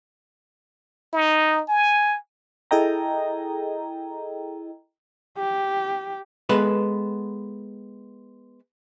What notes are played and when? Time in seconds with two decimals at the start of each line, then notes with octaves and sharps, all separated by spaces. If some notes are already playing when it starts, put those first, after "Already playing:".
1.13 D#4
1.69 G#5
2.71 E4 G#4 A4 D#5 G5 A#5
5.38 G4
6.49 G#3 B3 A4 B4